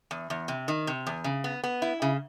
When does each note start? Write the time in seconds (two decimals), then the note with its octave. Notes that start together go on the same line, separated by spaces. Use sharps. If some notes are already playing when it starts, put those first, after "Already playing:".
0.11 E2
0.30 E2
0.48 C3
0.68 D#3
0.87 C3
1.07 E2
1.24 C#3
1.44 B3
1.63 B3
1.82 E4
2.02 C#3